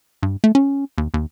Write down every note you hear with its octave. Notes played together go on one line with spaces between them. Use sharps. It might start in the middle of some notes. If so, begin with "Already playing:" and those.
G2
A3
C#4
D#2
D#2